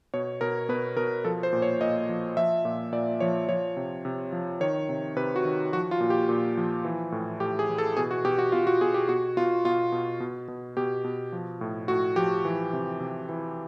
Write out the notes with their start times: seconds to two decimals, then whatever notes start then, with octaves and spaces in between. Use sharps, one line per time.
0.14 B2 C#5
0.41 B2 A#4
0.69 B2 B4
0.97 B2 A#4
1.24 F3 A4
1.43 C5
1.53 A#2
1.62 C#5
1.81 A#2 D#5
2.09 F3
2.37 F3 E5
2.65 A#2
2.92 A#2 D5
3.20 F3 C#5
3.49 F3 C#5
3.77 C3
4.05 C3
4.32 F3
4.60 D#3 C#5
4.89 C3
5.16 C3 B4
5.36 F#4
5.45 D#3
5.73 F3 F#4
5.91 F4
6.00 A#2
6.10 G4
6.29 A#2
6.57 F3
6.85 E3
7.12 A2
7.40 A2 G4
7.59 G#4
7.69 E3
7.78 A4
7.97 B2 G#4
8.11 F#4
8.25 B2 G4
8.39 F#4
8.52 B2 F4
8.67 F#4
8.81 B2 G#4
8.94 G4
9.09 B2 F#4
9.37 B2 F4
9.65 B2 F4
9.92 B2
10.20 B2
10.48 B2
10.77 B2 G4
11.04 B2
11.32 F3
11.61 A2
11.88 A2 F#4
12.16 F3 G4
12.45 E3
12.73 C3
13.00 C3
13.29 E3